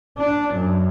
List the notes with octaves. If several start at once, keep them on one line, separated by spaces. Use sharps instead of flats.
D4
F#2